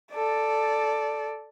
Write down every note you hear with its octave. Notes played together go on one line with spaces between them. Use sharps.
A4 D5